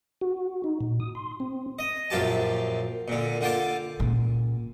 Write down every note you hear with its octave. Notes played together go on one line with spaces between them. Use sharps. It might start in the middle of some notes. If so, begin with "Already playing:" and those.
F#4
D#4
A#2
D#6
C6
C4
D#5
A#1 F#2 F4 G4 A5
A#2 D3
D3 F4 G5 A5 D6
A#2 C#3